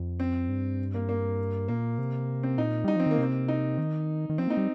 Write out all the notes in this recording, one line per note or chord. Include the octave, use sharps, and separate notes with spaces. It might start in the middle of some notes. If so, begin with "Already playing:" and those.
Already playing: F2
C4
G2
A#3
A#3
A#2 A#3
C3
C4
A#2 D#4
G3 D#4
F3 C4
D#3 A#3
C3
C4
D#4
D#3
D#3
F3 C4
A#3 D#4
G3